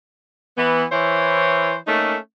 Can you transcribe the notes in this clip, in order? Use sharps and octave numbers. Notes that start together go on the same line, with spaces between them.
E3 B3
E3 E4 C5 C#5
A3 A#3 C#4 D#4 A4